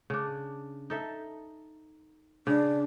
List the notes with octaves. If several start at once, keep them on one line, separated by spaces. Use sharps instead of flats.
C#3 D4
D#4 A4 E5
C#3 D4